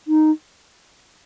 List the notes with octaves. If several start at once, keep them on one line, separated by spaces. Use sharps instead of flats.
D#4